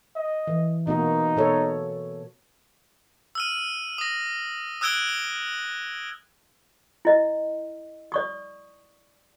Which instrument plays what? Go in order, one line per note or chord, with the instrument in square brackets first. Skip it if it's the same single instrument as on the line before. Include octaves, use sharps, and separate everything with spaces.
[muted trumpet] D#5
[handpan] E3
[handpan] B2 A#3 F#4 [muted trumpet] D#4
[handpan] B2 A4 C#5
[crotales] E6 F6 D#7
D#6 A#6
D#6 E6 F#6 G#6 D7 G7
[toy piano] E4 D#5
D5 C#6 D#6